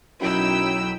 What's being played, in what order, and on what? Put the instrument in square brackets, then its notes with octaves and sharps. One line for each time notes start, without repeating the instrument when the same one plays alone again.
[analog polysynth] B1 F#3 B5 [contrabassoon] F#2 [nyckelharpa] D#4 E4 [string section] G5 E6